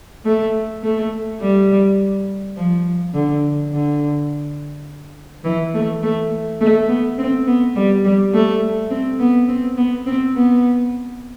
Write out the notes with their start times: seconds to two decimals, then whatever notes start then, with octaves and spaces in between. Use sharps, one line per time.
0.25 A3
0.83 A3
1.41 G3
2.56 F3
3.14 D3
3.72 D3
5.45 E3
5.74 A3
6.03 A3
6.61 A3
6.89 B3
7.18 C4
7.47 B3
7.76 G3
8.05 G3
8.34 A3
8.91 C4
9.20 B3
9.48 C4
9.77 B3
10.06 C4
10.36 B3